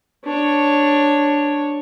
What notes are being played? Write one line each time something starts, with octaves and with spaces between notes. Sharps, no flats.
D4 C#5